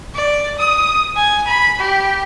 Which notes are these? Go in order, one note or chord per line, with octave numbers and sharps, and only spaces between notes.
D5
D#6
G#5
B5
G4